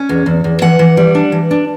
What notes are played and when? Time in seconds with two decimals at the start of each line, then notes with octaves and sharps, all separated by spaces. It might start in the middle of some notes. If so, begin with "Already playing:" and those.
Already playing: C#4
0.09 E2
0.26 E2
0.44 E2
0.62 E3 F#5
0.79 E3
0.97 G3
1.15 D4
1.32 E3
1.51 D4